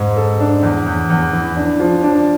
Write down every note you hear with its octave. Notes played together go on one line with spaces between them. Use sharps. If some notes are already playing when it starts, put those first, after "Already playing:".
Already playing: G#2 G#3
A4
D4
E2
E2
E2
E3
D4
F3
D4